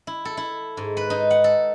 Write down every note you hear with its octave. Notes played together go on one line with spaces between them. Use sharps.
E4
A4
E4
G#2
B4
D#4
F#5
A4